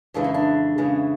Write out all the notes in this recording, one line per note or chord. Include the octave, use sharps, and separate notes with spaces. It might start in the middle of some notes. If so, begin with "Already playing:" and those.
F2 C#3 E3 G#3 D4
D#4
D4
F2 C#3 E3 G#3